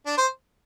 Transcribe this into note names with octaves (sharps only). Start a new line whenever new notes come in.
D4
C5